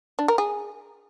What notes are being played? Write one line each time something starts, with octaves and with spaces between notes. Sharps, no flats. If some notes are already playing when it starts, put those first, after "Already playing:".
D4
A#4
G#4